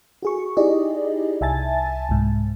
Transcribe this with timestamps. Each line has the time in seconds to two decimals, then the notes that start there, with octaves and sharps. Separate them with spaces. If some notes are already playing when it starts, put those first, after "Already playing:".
0.22 F#4 G#4 C#6
0.57 D#4 E4 G4 G#4 D5 D#5
1.41 C2 E5 G#5 A5 A6
2.09 C2 G#2